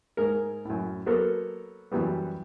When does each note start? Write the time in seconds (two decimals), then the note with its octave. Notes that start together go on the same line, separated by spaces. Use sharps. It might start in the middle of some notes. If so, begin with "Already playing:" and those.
0.17 G#2 G#4 A#4
0.65 F#2 A2
1.06 F#3 A#3 B3 A4 A#4 C5
1.92 F#2 E3 F#3 G3 B3